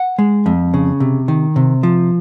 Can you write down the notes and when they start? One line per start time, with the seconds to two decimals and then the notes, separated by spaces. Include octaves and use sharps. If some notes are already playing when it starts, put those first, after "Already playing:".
Already playing: F#5
0.18 G#3
0.46 F2
0.74 C#3
1.00 C3
1.28 D#3
1.56 C3
1.83 F3